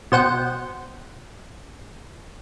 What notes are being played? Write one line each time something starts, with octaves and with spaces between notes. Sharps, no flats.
B2 C5 F#5 G5